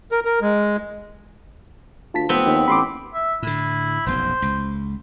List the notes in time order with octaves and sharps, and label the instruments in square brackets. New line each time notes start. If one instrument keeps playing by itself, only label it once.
[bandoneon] A#4
A#4
G#3
[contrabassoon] D2 [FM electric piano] F4 A5 B6
[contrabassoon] F1 [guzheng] B3 C4
[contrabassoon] D#2
[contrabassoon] A1 [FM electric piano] B5 C6 D6
[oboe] E5
[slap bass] A2 D3 [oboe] E4
[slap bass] F1 B1 F#2 [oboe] C5
[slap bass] C#2